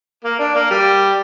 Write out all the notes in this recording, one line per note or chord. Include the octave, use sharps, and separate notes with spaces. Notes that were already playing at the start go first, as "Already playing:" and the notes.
A#3
D4
A#3
G3